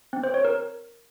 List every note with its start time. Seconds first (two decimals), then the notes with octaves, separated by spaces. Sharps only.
0.13 C4
0.24 C5
0.34 C#5
0.45 A#4